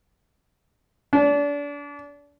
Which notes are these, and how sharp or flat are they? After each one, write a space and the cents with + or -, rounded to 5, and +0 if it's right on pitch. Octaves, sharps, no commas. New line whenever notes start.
D4 -30